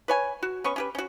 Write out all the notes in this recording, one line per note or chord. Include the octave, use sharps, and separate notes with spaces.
B4 C#5 G#5
F#4
B3 C#4 C#6
C#4 G4 B4
C#4 F#4